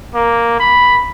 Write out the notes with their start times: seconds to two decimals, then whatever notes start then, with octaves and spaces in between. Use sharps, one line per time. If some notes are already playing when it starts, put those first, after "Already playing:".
0.15 A#3
0.60 B5